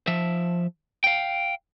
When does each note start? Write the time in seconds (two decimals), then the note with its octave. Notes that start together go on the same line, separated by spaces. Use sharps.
0.07 F3 E5
1.04 F5 G5